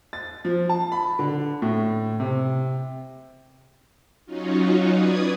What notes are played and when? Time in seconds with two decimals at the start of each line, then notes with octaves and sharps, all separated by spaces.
0.13 A6
0.45 F3
0.69 A5
0.92 B5
1.19 D3
1.62 A2
2.20 C3
4.26 F#3 C#4 D#4 F4 F#4
4.91 B4 D5 D#6 G#6